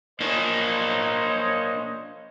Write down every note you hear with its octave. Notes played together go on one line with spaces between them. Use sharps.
A#3 D4 C5 C#5 D#5